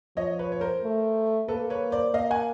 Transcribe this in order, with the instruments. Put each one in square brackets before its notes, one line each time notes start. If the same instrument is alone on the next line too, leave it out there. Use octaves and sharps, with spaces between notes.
[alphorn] F3 [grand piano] C#5 D#5
[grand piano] B4 C#5
C#5
A#4 C5
[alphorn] A3
[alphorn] A#3 [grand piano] A4 B4
[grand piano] B4 C#5
C5 D5
[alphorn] A#3 [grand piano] D#5 F5
[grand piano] F#5 G#5